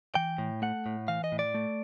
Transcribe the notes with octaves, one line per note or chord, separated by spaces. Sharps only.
E3 G5
A2
A3 F#5
A2
E3 F5
D#5
A2
D5
A3